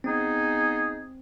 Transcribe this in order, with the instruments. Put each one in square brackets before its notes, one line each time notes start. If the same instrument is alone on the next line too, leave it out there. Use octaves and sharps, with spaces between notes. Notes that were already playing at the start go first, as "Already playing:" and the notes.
[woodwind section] G#3 B3 D#4 G#4 [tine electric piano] C4